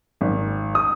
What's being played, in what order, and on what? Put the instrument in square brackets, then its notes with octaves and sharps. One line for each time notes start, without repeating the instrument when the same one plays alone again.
[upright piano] G#1
D#6